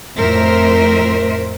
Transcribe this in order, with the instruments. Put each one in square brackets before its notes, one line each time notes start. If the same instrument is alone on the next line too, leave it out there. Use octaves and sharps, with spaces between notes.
[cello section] F2 A2 A#4 C5 E5